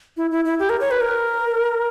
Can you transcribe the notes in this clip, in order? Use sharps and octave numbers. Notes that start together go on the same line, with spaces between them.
E4
E4
E4
G4
A#4
C#5
B4
A#4